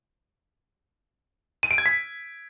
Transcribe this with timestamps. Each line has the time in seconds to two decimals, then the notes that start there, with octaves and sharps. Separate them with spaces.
1.63 D#7
1.71 D7
1.78 G#6
1.86 B6